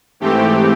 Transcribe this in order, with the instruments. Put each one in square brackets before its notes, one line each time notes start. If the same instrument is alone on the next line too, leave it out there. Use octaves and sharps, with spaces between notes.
[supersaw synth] G#2 E3 A3 C4 G4